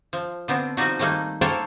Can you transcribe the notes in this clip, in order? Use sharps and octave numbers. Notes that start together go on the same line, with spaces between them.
F3
D3 B3 C4 D4
F3 G3 D4 D#4 F#4
D#3 G3 A3 A#3 D#4
A#3 A4 C5 C#5 G5 A5